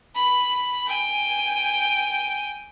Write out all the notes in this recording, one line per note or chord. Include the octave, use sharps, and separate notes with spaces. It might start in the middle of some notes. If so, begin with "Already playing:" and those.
B5
G5 G#5